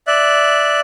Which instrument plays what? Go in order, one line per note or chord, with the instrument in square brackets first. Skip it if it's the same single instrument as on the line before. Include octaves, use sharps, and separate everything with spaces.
[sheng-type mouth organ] D5 E5 F#6